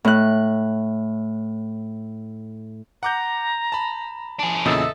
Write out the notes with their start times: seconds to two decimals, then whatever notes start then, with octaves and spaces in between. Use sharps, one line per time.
0.05 A2 F#6
3.03 F#5 A#5 D6 G6
3.72 A5 B5
4.39 D4 G#4
4.65 E2 A#2 C#3 A4 D#5 E5